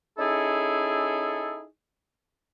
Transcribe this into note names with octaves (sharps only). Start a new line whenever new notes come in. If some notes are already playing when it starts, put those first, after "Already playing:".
C#4 D#4 E4 G#4 A4